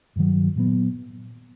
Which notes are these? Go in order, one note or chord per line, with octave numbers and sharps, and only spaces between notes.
G2 D#3 F#3
A#2 F#3 B3